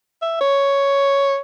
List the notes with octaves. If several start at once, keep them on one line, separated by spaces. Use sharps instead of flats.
E5
C#5